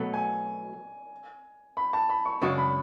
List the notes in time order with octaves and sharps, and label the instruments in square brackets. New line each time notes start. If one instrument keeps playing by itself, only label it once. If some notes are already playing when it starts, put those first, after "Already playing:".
Already playing: [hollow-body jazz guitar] B2 F#3 A3
[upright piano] G#5
B5
A5
B5
C#6
[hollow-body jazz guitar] F#2 C#3 G#3 D4 F#4 [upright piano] C#6
[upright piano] B5